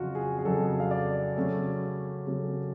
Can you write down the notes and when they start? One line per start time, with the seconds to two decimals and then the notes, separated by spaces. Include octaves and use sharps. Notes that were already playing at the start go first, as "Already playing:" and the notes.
Already playing: F2 C#3 F#3 F4 F#4
0.15 G#4
0.39 G#4
0.45 F2 C#3 F#3 A4
0.80 F5
0.91 D5
1.36 C#3 F#3 A3 C#4
2.27 C#3 F#3 A3 C#4